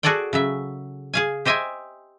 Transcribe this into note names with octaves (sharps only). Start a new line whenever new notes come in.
F#4 G#4 A4 D5 F#5 G5
C#3 F#3 E5
G#4 F5 G#5
G4 C5 D#5 E5 G5 G#5